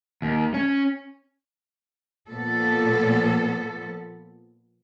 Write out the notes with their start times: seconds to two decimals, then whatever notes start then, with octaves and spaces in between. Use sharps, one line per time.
0.22 D#2
0.54 C#4
2.30 A#2 F3 B3 A4